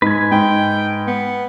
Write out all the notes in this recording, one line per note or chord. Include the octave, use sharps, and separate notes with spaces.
G#2 B4 G#5
G#2 G5
B3